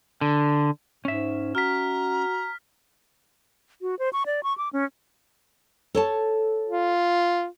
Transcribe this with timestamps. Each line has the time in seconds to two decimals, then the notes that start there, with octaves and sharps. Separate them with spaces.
0.21 D3
1.05 G#2 C#4 E5
1.55 F#4 A#5 F6 B6
3.82 F#4
3.99 C5
4.13 C#6
4.26 D5
4.43 C#6
4.58 D6
4.73 C#4
5.95 A4 C#5 A5
6.69 F4